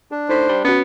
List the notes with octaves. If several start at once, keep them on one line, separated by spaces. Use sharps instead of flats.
D4
A2 D#4 C5 B6
G3
B3 C#4 F#4